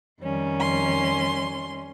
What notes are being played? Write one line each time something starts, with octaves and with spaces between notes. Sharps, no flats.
F2 D#3 G3 C#4
C6